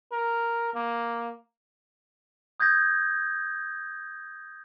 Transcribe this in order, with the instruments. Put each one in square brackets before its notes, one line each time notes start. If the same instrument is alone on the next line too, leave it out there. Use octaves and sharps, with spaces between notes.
[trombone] A#4
A#3
[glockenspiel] D#6 G6 G#6 A#6